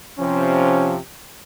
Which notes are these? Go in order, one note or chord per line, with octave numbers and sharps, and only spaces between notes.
C3 F3 C#4